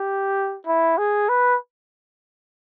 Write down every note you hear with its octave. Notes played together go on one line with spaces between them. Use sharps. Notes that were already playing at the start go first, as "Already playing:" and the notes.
Already playing: G4
E4
G#4
B4